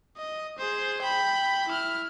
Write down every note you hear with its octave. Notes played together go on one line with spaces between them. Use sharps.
D#5
G#4 C5
G5 B5
E4 F6